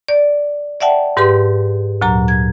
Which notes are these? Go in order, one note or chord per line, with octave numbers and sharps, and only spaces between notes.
D5
D5 E5 F#5 G5 A5
G#2 G4 B4 C6
D2 A#2 F#3 A#5
G#6